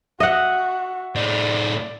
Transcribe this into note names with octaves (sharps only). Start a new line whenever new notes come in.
F#4 D#5 E5 F#5
A2 D#4 D5